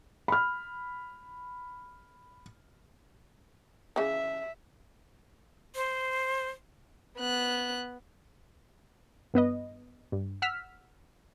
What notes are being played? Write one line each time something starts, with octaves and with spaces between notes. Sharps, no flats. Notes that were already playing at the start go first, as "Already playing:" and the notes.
B5 F6
C#3 E3 E5
C5
B3 F#6
G2 B3 B4 D#5
G2
F#5 E6 F6 B6